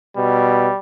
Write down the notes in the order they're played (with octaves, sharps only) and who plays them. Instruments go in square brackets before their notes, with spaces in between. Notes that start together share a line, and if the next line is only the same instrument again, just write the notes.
[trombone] B2 [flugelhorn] G3